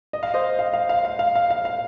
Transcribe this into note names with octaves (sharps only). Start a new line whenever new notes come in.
D#5
F5
C5 D#5
F5
F5
F5
F5
F5
F5
F5
F5